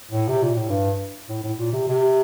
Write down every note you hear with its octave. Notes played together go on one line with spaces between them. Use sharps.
A2
C3
A#2
A2
G2
A2
A2
A#2
C3
C3